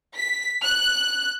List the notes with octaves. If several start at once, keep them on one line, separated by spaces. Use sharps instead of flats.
B6
F#6